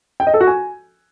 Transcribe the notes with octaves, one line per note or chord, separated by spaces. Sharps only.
G5
D#5
A4
F#4
G#5